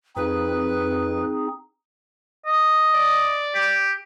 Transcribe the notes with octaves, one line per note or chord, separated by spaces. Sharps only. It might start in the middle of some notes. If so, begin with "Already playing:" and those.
F2 C4 D#4 G#4 B4
D#5
D5
G4